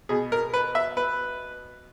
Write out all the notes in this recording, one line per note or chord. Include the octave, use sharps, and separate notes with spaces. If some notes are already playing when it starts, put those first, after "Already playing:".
B2 G#4
A#4
B4
E5
B4